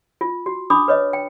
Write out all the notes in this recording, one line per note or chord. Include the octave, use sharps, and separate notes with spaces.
F4
F#4
D4 B5 D6 D#6
B4 C#5 D#5
G5